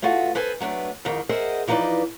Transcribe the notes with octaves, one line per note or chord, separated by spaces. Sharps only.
A3 B3 F4 F#4 A4
A4 B4 C5 G#5
F#3 A3 B3 D4
F2 G#2 D#3
G#4 A#4 C5 D#5 E5 F#5
E3 F3 D#4 A#4 B4 D5